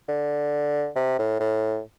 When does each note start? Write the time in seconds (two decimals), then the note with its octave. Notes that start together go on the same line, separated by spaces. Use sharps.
0.08 D3
0.96 C3
1.19 A2
1.40 A2